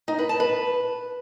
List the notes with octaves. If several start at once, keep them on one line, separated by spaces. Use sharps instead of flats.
D#4
B4
A5
B4